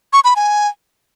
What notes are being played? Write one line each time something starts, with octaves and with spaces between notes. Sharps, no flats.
C#6
B5
G#5